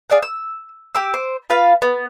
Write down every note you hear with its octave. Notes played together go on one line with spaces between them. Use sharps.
G#4 D5 F5 F#5
E6
G4 D6 E6
C5 D6
F4 B4 F5
B3